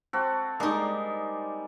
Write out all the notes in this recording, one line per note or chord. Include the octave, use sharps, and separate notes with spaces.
C4 F#4 A4
G3 G#3 A#3 D#4 D5